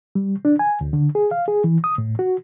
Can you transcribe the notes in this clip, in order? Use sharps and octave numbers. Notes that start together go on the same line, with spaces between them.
G3
D4
G#5
D2
D3
G#4
F5
G#4
E3
D#6
A2
F#4